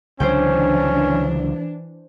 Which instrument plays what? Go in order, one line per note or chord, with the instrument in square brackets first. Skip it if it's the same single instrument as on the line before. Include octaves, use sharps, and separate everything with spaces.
[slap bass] C#2 D3 F#3 [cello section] E3 D4 [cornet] C#4 [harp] C5 G5